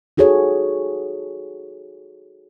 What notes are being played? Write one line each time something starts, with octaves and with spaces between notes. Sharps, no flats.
D#4 F#4 G#4 A4 C#5